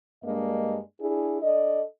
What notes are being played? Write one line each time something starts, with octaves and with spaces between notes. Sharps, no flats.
G2 G#3 A#3 D4 D#5
D4 E4 G#4
D4 A4 D5 D#5